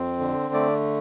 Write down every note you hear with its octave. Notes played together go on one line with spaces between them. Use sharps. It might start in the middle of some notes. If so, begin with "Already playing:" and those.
Already playing: F2 C4
D3
A3 D5